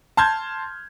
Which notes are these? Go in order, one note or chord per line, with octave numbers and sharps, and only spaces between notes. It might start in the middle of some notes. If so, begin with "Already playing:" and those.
A5 C6 F6 G6 G#6